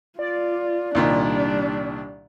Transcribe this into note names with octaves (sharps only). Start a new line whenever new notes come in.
F4 D5
C2 A#2 D#3 G3 D4